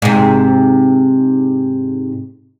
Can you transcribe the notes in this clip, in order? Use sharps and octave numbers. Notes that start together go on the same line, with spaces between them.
G#2 C3